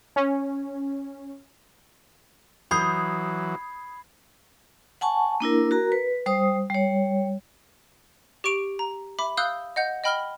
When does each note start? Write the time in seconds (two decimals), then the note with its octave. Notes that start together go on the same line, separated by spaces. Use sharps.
0.16 C#4
2.71 E3 F#3 B5 D#6 G6 G#6 C7
5.01 F#5 G#5 A5 C#6
5.40 A#3 D4 E4 A#4
5.71 F#4 A#4 A#5
5.92 B4
6.26 G3 C5 D#6
6.70 G3 C#5
8.44 G4 C#6 D7 F7
8.79 A#5
9.19 E5 B5 D6
9.37 F5 D#6 E6 F#6 G6 G7
9.76 D#5 F#5 G6
10.04 D#5 G5 B5 F6 F#7 G7